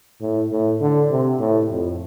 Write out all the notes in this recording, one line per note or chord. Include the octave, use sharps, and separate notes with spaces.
A2
A2
D3
C3
A2
F2